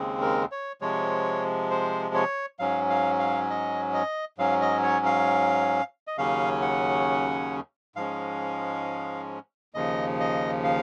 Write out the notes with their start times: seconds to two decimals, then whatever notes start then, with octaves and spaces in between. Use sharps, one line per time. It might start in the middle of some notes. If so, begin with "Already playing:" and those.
Already playing: D#2 C#3 G#3 C4
0.22 A#4
0.52 C#5
0.81 C3 F3 G#3 C#5
1.71 C5
2.15 C#5
2.59 G#2 F#3 C#4 F5
2.90 F5
3.19 F5
3.50 D#5
3.94 D#5
4.38 G#2 F#3 C#4 F5
4.61 D#5
4.83 C#5
5.06 F5
6.07 D#5
6.18 D#2 C#3 F#3 C#4 F5
6.61 F#5
7.96 G#2 F3 G#3 C#4 F5
9.74 D#2 C#3 F3 D#5
10.20 D#5
10.64 F5